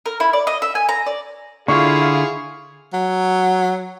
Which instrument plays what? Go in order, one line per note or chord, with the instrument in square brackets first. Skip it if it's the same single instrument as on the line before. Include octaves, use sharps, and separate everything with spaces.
[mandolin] A#4
E4
D5
D#5
E5
G#5
A#5
D5
[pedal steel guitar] D3 [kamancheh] E4 F4 [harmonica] G#4 F5 [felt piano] C#6
[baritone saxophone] F#3